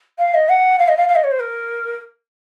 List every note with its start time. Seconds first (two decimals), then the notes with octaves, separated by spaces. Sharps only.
0.19 F5
0.34 D#5
0.49 F#5
0.79 F5
0.88 D#5
0.97 F5
1.08 F5
1.15 D#5
1.24 C#5
1.31 C5
1.40 A#4